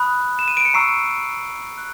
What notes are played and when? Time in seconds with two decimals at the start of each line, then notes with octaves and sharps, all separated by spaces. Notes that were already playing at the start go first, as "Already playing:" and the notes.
Already playing: B5 D#6 F#6
0.39 E7
0.48 D#7
0.57 D7
0.65 C#7
0.74 A#5 C#6 E6 C7
1.78 F#6